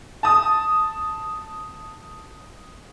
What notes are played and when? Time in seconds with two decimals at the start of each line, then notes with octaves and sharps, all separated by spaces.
0.23 A5 D#6